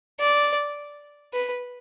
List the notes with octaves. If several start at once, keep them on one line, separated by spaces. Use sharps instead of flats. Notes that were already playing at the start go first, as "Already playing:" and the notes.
D5
B4